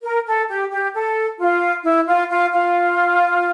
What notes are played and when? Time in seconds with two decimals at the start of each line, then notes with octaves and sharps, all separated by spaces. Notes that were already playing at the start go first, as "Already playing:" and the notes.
0.03 A#4
0.26 A4
0.48 G4
0.71 G4
0.94 A4
1.39 F4
1.83 E4
2.07 F4
2.29 F4
2.51 F4